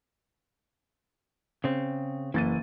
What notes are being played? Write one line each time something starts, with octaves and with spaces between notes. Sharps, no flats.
C#3 C4
F#1 E3 A6 D#7